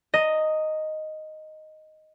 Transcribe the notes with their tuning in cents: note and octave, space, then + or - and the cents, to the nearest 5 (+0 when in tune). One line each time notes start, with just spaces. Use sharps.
D#5 +0 A#5 -25